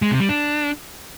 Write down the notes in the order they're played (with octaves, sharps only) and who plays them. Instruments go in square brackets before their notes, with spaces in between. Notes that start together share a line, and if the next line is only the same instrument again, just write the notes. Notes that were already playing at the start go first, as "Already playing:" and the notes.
[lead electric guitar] G#3
C3
G3
D4